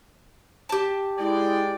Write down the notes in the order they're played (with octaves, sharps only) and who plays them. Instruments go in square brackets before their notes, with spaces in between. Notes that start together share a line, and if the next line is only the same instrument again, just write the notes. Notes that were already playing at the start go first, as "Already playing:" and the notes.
[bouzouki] G4 A5
[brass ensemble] G#3 D5 G5 [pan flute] E4